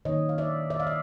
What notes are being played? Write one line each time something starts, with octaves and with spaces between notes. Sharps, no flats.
D#3 F#3 A#3 D#4 C#5 D#5
F5
D5 E5
D5 E5
D#5 F5
E5